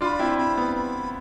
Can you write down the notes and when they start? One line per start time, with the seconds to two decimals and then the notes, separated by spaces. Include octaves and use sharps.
0.01 D4 F4 B5 C6
0.19 C4 E4
0.38 C4 B5
0.57 B3
0.76 B5